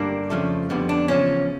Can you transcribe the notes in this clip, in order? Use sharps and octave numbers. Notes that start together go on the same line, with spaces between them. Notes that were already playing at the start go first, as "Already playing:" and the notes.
Already playing: G2 D3 G3 A#3 D4
F2 C#3 F3 A3
F2 D3 G3 B3
D4
E2 C#3 F3 C#4